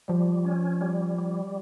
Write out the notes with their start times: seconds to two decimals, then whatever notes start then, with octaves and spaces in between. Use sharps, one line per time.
0.08 F3 G3
0.45 C#4
0.81 G3
1.18 G3